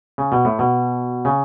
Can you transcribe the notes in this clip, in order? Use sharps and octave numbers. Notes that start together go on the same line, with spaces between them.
C#3
B2
A2
B2
C#3